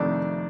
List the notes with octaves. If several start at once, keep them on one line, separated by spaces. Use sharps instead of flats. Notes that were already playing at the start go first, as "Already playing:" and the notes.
Already playing: F2 C3 D#3 A3 D4 D5